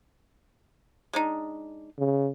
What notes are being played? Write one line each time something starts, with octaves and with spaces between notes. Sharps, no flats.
G#3 D4 D#4
C#3